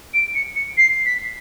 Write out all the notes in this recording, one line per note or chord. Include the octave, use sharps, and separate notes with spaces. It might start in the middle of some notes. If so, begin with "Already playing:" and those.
D7
C#7
C#7
C7
B6